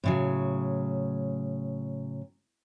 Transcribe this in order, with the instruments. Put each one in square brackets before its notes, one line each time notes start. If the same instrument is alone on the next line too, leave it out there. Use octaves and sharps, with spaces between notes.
[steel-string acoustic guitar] A2 C#3 F#3